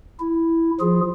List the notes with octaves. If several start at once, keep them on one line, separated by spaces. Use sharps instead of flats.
E4
F3 F4 G#4